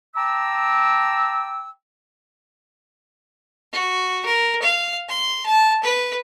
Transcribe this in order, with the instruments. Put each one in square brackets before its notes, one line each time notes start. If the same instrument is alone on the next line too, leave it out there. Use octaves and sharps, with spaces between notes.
[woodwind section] G5 A5 A#5 D6 E6
[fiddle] F#4
A#4
F5
C6
A5
B4